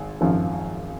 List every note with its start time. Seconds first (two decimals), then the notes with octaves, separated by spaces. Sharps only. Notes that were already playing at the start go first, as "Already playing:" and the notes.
Already playing: G#1
0.21 G#1 F#2 F3